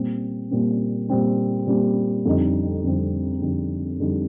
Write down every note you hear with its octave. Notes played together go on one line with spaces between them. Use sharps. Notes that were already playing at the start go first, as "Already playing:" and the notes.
Already playing: A#2 G3 C4
A#2 G3 C4
A#2 G3 C4
A#2 G3 C4
F2 D3 G3 C4 D#4
F2 D3 G3 C4 D#4
F2 D3 G3 C4 D#4
F2 D3 G3 C4 D#4